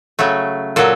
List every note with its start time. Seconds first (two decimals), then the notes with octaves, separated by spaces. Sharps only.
0.19 C#3 F#3 A3
0.76 A#2 F#3 A4